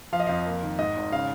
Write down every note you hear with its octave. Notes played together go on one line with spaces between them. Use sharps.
F3 F5
D#5
F2 F5
A#3
D#3
G#2 D#5
G#1
C#3 F5